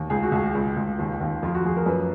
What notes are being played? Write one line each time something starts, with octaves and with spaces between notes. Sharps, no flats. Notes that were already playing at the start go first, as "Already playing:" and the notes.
Already playing: D#2
C#2 G#4
F#4
C#2 G#4
C#2
C#2
D#2
D#2
F2 F4
F#4
F2 G#4
A#4
F#2 B4